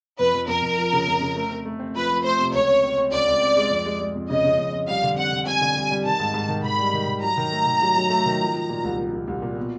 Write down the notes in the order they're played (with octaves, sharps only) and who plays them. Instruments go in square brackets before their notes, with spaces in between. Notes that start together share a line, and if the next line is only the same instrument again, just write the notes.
[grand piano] F2 [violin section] B4
[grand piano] F2
[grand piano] F2 [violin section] A#4
[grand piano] F2
F3
C#3
F2
C#3
A3
C4
A3
C4
[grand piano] F3 [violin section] B4
[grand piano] F3
[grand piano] A3 [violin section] C5
[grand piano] C3
[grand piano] C#2 [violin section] C#5
[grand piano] C4
C4
C4
[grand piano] C#2 [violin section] D5
[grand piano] C#2
C4
G#3
F2
G#3
G#3
F2
[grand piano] C#3 [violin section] D#5
[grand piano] C#3
F2
F2
[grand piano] G3 [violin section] F5
[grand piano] D3
[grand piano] C4 [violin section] F#5
[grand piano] D3
[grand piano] C4 [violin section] G#5
[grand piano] D3
G3
G3
[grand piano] D#3 [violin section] A5
[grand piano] G#2
G#2
D#3
[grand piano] D#3 [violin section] B5
[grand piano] G3
D#3
D#3
[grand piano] F#3 [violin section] A#5
[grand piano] D#3
A3
D#3
F#3
F#3
A3
D#3
F3
F3
A#2
C2
F3
C2
C2
A#2
B2